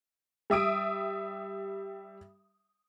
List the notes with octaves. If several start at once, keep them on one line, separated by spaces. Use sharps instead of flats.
G3 E5 D#6 D7